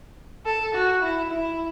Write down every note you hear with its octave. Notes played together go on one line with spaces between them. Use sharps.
A4
F#4
E4
E4